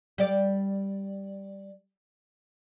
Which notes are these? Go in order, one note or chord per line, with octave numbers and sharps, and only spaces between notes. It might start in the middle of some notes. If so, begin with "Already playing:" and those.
G3 D5